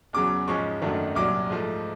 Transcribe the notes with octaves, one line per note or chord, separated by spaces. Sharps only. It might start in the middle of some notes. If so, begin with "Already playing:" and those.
E2 C#3 F#3 D6
G#2 F3 G#3 C#4 C#6
F#2 D#3 F#3 A3 D4
C2 A#2 F#3 D6
G#2 F3 A3